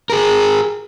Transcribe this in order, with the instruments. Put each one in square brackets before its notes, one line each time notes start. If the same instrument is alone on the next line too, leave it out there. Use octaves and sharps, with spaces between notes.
[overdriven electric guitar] G#4 A#4